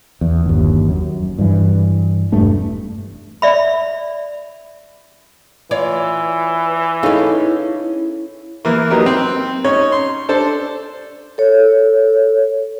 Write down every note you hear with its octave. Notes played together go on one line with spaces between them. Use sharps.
E2
G1 D#2
F#2
G2 E3
E1 G2 A3 D4
D5 E5 B5
E3 F4 C#5 D5
C#4 D#4 E4 G#4 A4 F5
E3 A#3
F#3 A#3 B3 D#4 G4 A#4
C4
C#4 D#4 C#5
C6
D4 A4 C5
A4 C#5